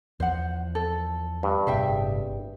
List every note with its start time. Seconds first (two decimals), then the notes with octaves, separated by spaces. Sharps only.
0.20 E2 F3 C5 F#5
0.75 A4
1.43 G2
1.67 G1 A2 C3 G#4 E5 G5